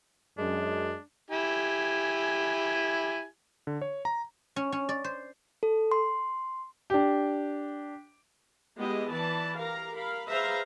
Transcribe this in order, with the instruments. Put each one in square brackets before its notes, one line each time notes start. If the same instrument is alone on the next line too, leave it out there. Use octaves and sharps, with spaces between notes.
[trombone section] F#2 [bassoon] G#3 [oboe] D4
[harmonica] E4 G4 G#5
[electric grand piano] D3
C#5
A#5
[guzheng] C#4
C#4
D5
C5
[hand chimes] A4
C6
[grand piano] D4 G4
[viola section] G#3 B3 E4 G4 D#5
E3 D5 A5 B5
G4 A#4 F5 A#5
A#4 F5 B5
G#4 B4 C5 E5 F5 A#5